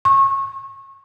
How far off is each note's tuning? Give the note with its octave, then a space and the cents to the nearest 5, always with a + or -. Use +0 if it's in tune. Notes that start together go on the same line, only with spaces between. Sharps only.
C#6 -25